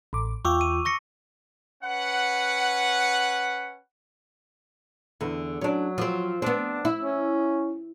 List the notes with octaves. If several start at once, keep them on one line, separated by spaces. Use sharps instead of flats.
A1 D6
E2 F4 G5 C#6 D6 E6
D#7
C#6 A#6 C#7
C#4 B4 F#5
E2 D3
F#3 C#4 D4
F3 C4
B3 C4 D4
E4
C#4